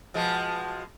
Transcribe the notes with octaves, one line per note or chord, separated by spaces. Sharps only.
B2 F3 G#3